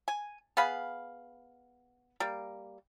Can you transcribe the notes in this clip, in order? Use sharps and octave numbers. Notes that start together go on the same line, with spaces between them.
G#5
B3 G#4 F5 B5
G3 A#3